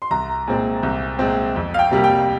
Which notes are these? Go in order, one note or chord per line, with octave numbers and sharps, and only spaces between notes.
C6
C2 A#5
A#2 G#3 C4
C2
A#2 G#3 C4
F2
F5
G5
C3 G3 A#3
G5